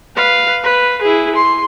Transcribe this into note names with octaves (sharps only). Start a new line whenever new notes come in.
B4 F5
B4
E4 G#4
C6